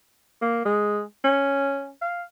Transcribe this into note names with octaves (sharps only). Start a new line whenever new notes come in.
A#3
G#3
C#4
F5